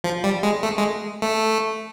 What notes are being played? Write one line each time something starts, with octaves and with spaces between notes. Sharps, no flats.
F3
G3
G#3
A3
G#3
A3